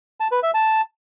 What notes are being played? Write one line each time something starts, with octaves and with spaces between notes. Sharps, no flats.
A5
B4
E5
A5